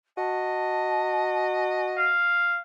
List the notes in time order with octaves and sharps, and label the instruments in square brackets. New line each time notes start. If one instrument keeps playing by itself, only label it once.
[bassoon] F#4 [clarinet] D#5 [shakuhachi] A5
[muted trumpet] F5